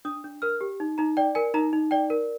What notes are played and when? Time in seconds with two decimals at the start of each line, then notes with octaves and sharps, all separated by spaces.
0.05 D4 D#6
0.24 D4
0.42 A#4 F6
0.61 G4
0.80 D#4
0.98 D#4 A#5
1.17 D5 G5
1.35 A#4 G#5
1.54 D#4 A#5
1.73 D#4
1.91 D5 G5
2.10 A#4